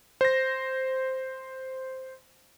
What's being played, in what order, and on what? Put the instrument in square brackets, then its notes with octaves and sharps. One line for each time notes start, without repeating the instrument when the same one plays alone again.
[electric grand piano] C5 A#6